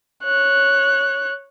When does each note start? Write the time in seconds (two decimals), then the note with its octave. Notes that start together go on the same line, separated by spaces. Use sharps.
0.24 C#5 F#6